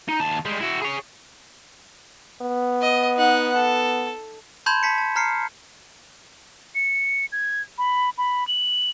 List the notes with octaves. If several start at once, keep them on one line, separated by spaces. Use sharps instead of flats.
D#4
D#2 A5
G3 G#3
E4 F#4
G#4 C#5
B3
D#5
D#4 F#5
A4
A5 B5 C6 G6 G#6 E7
A5 B6 C#7
A5
A#5 F6 C7 C#7
C#7
G#6
B5
B5
F#7